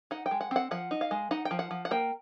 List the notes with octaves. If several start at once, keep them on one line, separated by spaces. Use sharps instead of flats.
D#4 F#5
G5
G#3
F#5
C4 F#5
F3 F#5
D#4
F5
G#3
D#4 F#5
G5
F3
F#5
F3
F#5
A#3 G5